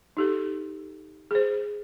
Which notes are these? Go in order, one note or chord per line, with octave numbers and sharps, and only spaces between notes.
D#4 G4 A4
G#4 C5